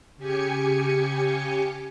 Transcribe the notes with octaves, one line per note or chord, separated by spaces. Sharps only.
C#3 G4 G#5 C#7